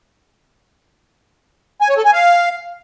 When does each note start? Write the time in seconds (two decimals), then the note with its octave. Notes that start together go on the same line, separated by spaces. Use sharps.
1.81 G#5
1.89 C#5
1.97 A4
2.05 G#5
2.13 F5